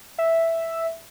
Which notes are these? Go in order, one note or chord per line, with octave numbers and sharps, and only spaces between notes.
E5